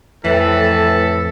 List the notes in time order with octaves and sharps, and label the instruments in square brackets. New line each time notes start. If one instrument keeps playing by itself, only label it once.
[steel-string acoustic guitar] F2 [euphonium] A2 [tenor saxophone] E3 [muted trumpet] A4